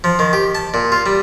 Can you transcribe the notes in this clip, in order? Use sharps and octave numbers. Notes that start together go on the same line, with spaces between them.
F3
D#3
G4
A5
A#2
F4
G3